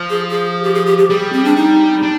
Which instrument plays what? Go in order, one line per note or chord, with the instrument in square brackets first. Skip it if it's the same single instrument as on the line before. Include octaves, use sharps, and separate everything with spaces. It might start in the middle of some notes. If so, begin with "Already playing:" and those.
Already playing: [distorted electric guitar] F3
[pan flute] G#4
G#4
G4
G#4
G4
G4
[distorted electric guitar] G3 [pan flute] G#4
[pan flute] C4
D4
D#4
[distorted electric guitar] D4